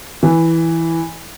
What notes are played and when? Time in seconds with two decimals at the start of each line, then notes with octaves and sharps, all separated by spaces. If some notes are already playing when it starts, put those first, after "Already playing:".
0.23 E3